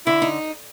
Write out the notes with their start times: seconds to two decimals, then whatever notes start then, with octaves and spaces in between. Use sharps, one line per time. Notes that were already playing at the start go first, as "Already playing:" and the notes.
0.06 D3 E4
0.22 D#4